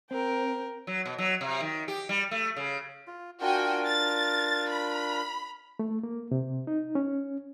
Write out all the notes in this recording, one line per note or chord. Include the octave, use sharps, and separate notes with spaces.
C4 A#4 G5
F#3
B2
F#3
C3
D#3
G4
G3
A3
C#3
F4
D4 F4 F#4 A#4 G5 G#5
A6
B5
A3
A#3
C3
D#4
C#4